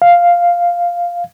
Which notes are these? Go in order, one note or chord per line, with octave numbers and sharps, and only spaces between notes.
F5